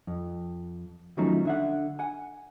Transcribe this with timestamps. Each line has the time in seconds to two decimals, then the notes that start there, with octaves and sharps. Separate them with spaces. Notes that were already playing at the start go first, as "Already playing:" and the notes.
0.07 F2
1.17 D#3 F3 F#3 A3 C#4 D#4
1.45 D3 E5 F#5
1.99 F#5 G#5